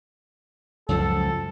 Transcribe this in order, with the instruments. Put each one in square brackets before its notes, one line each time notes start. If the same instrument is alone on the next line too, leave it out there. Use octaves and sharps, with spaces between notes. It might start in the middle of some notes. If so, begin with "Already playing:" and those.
[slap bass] C#2 F#2 F3 [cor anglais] A4